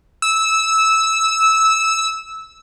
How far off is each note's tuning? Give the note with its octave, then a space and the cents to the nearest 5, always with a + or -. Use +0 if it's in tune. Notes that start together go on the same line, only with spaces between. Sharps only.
E6 -15